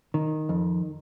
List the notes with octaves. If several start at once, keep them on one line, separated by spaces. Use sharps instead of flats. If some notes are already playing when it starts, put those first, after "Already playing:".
D#3
F2